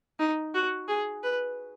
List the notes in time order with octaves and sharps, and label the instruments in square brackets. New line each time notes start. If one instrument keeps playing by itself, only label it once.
[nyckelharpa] D#4
F#4
G#4
B4